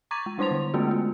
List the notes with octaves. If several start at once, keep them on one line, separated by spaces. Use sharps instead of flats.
A#5 C#6 D6 G#6 A6 D#7
G#3
G3 D4 E4 C5 C6 F7
D3
G#3 A3 B3 C#4 F4 F#4
G#3 F4